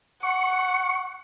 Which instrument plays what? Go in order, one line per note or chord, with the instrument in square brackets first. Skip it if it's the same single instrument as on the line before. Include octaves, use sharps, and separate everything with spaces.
[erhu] F#5 [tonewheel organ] C#6